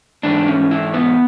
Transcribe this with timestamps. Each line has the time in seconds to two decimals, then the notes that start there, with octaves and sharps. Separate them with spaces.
0.23 G#2 E3 D4
0.47 C#4
0.71 E4
0.94 B3